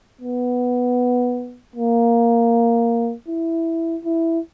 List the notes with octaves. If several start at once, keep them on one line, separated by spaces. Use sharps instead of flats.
B3
A#3
E4
E4